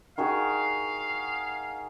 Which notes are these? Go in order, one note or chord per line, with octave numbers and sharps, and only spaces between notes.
D#3 F#4 G#4 F5